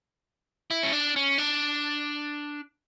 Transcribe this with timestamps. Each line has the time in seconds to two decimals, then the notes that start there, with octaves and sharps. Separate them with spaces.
0.71 E4
0.83 C#4
0.93 D4
1.16 C#4
1.38 D4